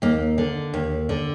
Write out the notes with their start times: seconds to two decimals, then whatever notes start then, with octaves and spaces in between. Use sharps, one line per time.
0.02 D#2 A#3
0.38 D3
0.74 D#2
1.09 D3